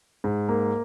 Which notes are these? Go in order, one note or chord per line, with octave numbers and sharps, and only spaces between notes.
G#2
A#3